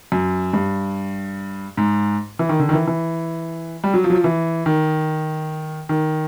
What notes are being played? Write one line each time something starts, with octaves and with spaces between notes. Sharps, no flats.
F#2
G2
G#2
E3
D#3
D3
D#3
E3
E3
G3
F#3
F3
F#3
F3
E3
D#3
D#3